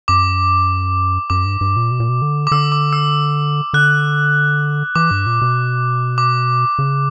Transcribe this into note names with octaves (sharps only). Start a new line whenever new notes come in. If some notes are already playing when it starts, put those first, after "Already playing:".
F#2 D6
F#2 D6
G2
G2
A#2
B2
A#2
B2
D3
D6
D3 E6
D6
E6
D3 F#6
E3 D6
G2
A#2
B2
D6
C#3